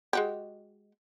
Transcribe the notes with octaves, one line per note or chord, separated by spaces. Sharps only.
G#3 F#4 G4